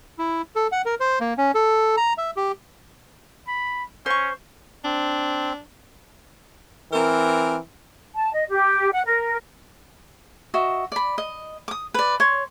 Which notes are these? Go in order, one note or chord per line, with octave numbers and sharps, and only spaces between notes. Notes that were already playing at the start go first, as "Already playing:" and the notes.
E4
A4
F#5
A#4
C5
A#3
C#4
A4
A#5
E5
G4
B5
C#4 C5 C#6
C4 D4
E3 C4 A#4
A5
D#5
G4
F#5
A#4
F#4 D#5 E5
D5 B5
D#5
D6 D#6
B4 D5
C#5 C6